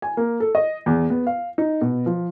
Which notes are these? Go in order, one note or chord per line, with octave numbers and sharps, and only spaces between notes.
G#5
A#3
A4
D#5
E2
B3
F5
D#4
B2
F3